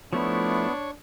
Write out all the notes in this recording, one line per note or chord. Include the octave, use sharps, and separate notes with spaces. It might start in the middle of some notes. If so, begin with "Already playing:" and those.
F3 A3 B3 D4 E4 C#5